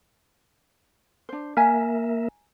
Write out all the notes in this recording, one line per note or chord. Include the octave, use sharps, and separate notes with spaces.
D4 C5
A#3 A#4 E5 G#5 A#5